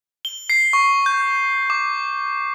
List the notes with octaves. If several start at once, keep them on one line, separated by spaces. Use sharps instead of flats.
G7
C7
C#6
G6
D6